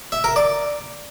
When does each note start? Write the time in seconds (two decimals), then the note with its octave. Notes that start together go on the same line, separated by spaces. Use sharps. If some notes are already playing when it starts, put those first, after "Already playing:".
0.12 E5
0.24 A#4
0.36 D5